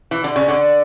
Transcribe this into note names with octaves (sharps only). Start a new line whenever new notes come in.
E3
D3
C#3
D3